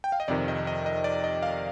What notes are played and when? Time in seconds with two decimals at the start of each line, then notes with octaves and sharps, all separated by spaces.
0.04 G5
0.12 F5
0.20 D#5
0.28 F2 C3 D#3 D5
0.48 D#5
0.67 D#5
0.86 D#5
1.04 D5
1.24 D#5
1.43 F5